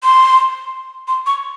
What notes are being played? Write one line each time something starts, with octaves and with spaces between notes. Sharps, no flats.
C6
C6
C#6